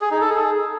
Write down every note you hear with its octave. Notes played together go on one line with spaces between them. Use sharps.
G#4
D#4
A4
G#4